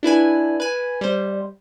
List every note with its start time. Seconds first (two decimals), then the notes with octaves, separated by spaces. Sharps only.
0.03 D4 E4 B4 G#5
0.60 B4 G#5
1.01 G3 C5